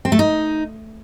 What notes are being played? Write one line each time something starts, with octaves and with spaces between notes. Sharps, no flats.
C4
A3
D#4